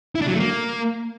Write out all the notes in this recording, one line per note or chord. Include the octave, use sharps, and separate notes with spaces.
E4
D4
F#3
A3
A#3